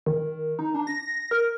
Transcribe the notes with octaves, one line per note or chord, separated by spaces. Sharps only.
D#3
D#4
D4
A#6
A#4